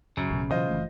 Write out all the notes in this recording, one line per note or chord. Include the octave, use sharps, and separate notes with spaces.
F#2 C#3
A1 B2
B2 E3 F#3 F4 C5 D#5
F#1 E3 A3